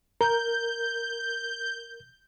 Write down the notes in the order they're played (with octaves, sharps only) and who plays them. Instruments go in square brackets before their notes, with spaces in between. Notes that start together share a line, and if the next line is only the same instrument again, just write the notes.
[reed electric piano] A#4 [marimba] A#5 [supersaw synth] G6